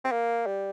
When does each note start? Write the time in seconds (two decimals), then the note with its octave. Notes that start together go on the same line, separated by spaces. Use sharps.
0.05 C4
0.12 A#3
0.47 G3